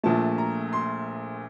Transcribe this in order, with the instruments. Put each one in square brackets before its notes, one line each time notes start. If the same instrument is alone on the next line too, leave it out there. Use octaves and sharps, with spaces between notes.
[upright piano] A#1 A#2 A3 A5
A#5
C6